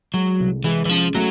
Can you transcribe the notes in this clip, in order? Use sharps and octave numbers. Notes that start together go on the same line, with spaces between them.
F#3 G#3
C2
E3 G#3
E3
F3 C#4
F#3 A3